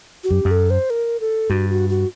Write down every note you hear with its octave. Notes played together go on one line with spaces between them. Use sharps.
F#4
F#2 G4
F#2
A4
C5
A#4
A4
G2 F#4
F#4
F#4